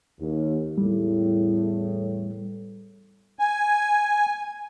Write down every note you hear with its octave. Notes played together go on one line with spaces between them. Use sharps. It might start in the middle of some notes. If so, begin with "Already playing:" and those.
D#2
E2 A2 G3
G#5